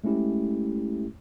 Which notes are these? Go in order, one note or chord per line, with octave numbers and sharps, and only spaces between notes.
G#3 A3 C#4 E4 G4